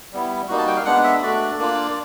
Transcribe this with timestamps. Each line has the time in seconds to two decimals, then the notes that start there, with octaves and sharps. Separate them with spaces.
0.13 G3 B3 E4
0.48 G3 A#3 D#4 F#4
0.58 A5
0.67 G5
0.76 F5
0.85 G#3 B3 D4 F#5
1.04 E5
1.22 A3 D4 F#4 D5
1.59 A#3 D4 F4